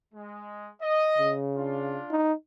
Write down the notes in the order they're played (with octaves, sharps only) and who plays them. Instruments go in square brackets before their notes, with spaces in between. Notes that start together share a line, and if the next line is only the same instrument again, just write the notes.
[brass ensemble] G#3
D#5
[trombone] C#3
[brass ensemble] D4 F4
[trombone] D#4